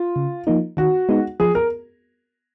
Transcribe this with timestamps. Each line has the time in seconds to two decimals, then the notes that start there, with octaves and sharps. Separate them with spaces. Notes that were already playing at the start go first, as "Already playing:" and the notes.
Already playing: F4
0.16 C#3
0.47 F3 A#3 D#4
0.77 D#3 F#4
1.09 G#3 B3 D#4
1.40 F3 G#4
1.55 A#4